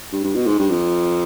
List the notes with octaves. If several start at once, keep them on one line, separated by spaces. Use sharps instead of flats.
G2
G2
B2
G#2
G2
F2